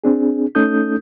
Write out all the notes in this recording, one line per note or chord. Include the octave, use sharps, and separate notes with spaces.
C4 D4 G#4
A3 C#4 D#4 A4 D#6 G6